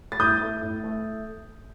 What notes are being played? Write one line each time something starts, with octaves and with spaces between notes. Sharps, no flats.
A6
A2 D#6 G6
A3
A2
A3